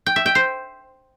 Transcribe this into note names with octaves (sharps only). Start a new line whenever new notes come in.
G5
E5
G5
C5